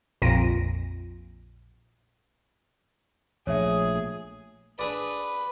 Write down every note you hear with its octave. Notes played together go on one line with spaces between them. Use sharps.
A#1 F2 A#2 A#6 D7 D#7
A#1 F3 A3 G#4 C#5 E5
D4 G#4 B4 D5 B5